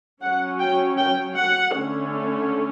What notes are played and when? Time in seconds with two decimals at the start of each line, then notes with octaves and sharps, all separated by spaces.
0.22 F#3 C#4 F#5
0.60 G5
0.98 G5
1.36 F#5
1.74 D3 A3 C#4